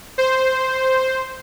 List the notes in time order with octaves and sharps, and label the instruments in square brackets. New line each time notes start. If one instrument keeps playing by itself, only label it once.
[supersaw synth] C5